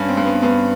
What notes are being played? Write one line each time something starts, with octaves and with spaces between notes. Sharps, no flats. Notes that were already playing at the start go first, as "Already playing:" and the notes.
Already playing: G2 C#4
C4
G2
B3
G2 B3